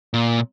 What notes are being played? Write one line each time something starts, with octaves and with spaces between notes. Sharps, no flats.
A#2